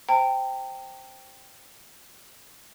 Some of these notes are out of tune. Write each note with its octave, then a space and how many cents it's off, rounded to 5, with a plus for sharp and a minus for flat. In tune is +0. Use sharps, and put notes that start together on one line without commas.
C5 +0 G5 +0 A#5 -40